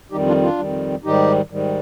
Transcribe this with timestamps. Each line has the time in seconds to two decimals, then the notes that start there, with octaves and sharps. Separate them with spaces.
0.11 F2 D#3 G3 D#4 G4
0.27 D4 F4
0.42 D4 F4
0.58 F2 D#3 G3
1.04 G#2 D#3 G3 D#4 G4
1.50 G#2 D#3 G3